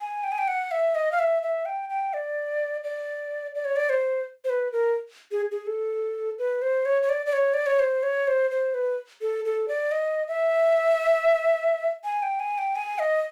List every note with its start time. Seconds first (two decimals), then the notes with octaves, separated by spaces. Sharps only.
0.01 G#5
0.24 G5
0.32 G#5
0.38 G5
0.48 F#5
0.71 E5
0.95 D#5
1.12 F5
1.19 E5
1.43 E5
1.66 G5
1.89 G5
2.14 D5
2.84 D5
3.55 D5
3.65 C#5
3.76 D5
3.90 C5
4.44 C5
4.50 B4
4.72 A#4
5.32 G#4
5.52 G#4
5.67 A4
6.39 B4
6.62 C5
6.85 C#5
7.03 C#5
7.09 D5
7.26 D5
7.33 C#5
7.54 D5
7.66 C#5
7.79 C5
8.03 C#5
8.28 C5
8.51 C5
8.74 B4
9.21 A4
9.45 A4
9.68 D5
9.92 D#5
10.28 E5
12.04 G#5
12.23 G5
12.40 G#5
12.58 G5
12.76 G#5
12.99 D#5